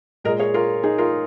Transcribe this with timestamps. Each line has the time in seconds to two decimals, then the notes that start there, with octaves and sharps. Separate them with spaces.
0.24 A#2 G#3 A#4 D#5
0.39 G#4 C#5
0.54 F4 A#4
0.83 D#4 G#4
0.98 F4 A#4